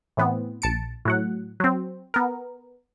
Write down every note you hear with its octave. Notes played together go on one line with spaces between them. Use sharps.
A2 E3 B3 C4
A#1 A5 C#7 D7
A2 F#3 F#5
F#3 C4
B3 A#4